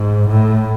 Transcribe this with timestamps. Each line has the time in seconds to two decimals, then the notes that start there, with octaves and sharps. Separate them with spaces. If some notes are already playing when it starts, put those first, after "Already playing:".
Already playing: G#2
0.28 A2